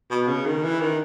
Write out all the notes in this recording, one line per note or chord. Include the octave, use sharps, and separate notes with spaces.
B2
C#3
D#3
E3
D#3